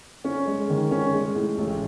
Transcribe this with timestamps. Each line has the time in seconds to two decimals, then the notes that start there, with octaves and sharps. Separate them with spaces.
0.24 C#4
0.47 G#3
0.70 D#3
0.91 C#4
1.14 G#3
1.35 A2
1.58 A1